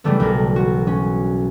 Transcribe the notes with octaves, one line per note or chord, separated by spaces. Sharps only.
C#3 E3 F#3 G3 A3 B3
B1 G3 A#4
F#4
C#4